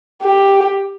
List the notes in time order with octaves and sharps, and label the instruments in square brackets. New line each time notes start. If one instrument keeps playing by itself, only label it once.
[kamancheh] G4